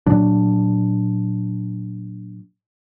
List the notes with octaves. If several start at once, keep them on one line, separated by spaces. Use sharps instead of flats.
A#2 F#3 D4